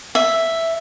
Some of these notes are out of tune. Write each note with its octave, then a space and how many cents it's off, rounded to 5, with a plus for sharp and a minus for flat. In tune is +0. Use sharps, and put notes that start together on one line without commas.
E5 +0